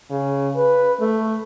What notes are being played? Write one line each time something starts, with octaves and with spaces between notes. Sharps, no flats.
C#3
B4
A3